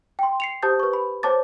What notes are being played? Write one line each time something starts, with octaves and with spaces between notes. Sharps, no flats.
G5 C6
C7 C#7 F7
G4 C5 A5 D#6 G6 A6
B4 C#6
B5
C5 C#5 A5 D6 A6